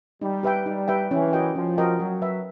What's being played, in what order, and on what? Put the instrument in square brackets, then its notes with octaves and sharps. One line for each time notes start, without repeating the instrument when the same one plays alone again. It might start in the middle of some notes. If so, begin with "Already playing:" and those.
[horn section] G3 [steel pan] D#4
[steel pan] G4 B4 E5 G5
[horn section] G3 [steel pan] D#4
[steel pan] G4 B4 E5 G5
[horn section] E3 [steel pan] C#4
[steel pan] F#4 A#4 D#5 G5
[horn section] F3 [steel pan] C#4
[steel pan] F#4 A#4 D#5 G5
[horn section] F#3 [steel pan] F#4
[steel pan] B4 E5